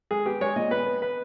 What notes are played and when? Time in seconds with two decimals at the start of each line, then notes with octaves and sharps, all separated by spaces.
0.11 G#3 G#4
0.25 B3 G4
0.41 G#3 C#5
0.56 A#2 D#5
0.71 B3 B4
0.86 B3
1.02 B4